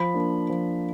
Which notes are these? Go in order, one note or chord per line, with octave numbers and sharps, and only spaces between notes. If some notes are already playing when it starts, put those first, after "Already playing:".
Already playing: F3 B5
A#3 D4
F3